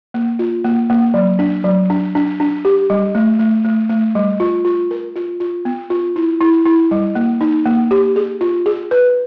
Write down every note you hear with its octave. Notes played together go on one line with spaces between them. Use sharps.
A#3
F4
A#3
A#3
F#3
D4
F#3
D4
D4
D4
G4
G3
A3
A3
A3
A3
G3
F4
F4
A#4
F4
F4
B3
F4
E4
E4
E4
G3
A#3
D#4
A#3
G4
G#4
F4
G#4
B4